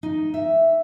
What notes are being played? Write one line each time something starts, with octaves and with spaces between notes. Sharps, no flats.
D#4
E5